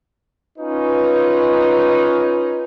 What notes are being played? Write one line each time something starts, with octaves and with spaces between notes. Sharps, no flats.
C#4 D#4 F4 B4